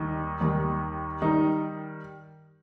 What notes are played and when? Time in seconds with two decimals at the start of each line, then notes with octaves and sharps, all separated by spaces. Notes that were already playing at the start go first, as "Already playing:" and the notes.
Already playing: D#2 D#3 G3 D#4
0.41 D#2 D#3 G3
1.22 D#3 G3 D#4